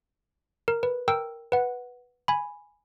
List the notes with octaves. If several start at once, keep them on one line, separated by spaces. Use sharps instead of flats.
A#4
B4
A#4 G5 E6
B4 F#5
G#5 B5